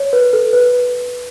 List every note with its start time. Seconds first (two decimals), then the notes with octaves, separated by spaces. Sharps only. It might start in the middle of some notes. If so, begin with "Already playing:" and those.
Already playing: C#5
0.13 B4
0.33 A4
0.53 B4